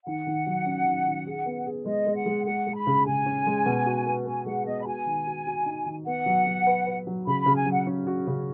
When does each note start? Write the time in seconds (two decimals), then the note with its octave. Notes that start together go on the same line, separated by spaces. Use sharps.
0.06 D#3 F#5
0.27 D#3
0.46 F#3
0.66 C#4
0.86 D#3
1.06 D#3
1.27 G#4
1.46 B3
1.66 G#4
1.86 G#3 D#5
2.06 G#3
2.16 F#5
2.26 G#3
2.46 G#3 F#5
2.67 G#3
2.76 B5
2.87 C#3
3.06 C#3 G#5
3.26 C#4
3.47 G#3
3.66 B2
3.86 F#4
4.06 B3
4.26 B3 G#5
4.46 G#3 F#5
4.66 B3 D#5
4.82 B5
4.86 F#4 G#5
5.06 D#3
5.27 F#4
5.47 F#4
5.66 D#4
5.86 D#3
6.06 B3 F#5
6.26 F#3
6.47 F#3
6.67 B4
6.86 B4
7.07 F#3
7.26 C#3 B5
7.41 C#3 B5
7.56 G#5
7.66 F#3
7.72 F#5
7.87 C#4
8.07 F#4
8.27 C#3